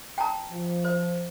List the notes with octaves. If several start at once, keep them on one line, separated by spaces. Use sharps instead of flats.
G5 A5 A#5
F3
C5